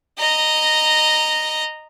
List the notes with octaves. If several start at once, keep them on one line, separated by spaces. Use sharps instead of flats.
D#5 A#5